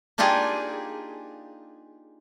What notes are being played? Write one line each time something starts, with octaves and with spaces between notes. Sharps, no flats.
A#3 D4 D#4 F4 G4 G#4